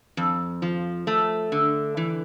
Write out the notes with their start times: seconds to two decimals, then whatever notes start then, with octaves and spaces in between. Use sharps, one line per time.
0.17 F2
0.62 F3
1.07 A3
1.52 D3
1.97 E3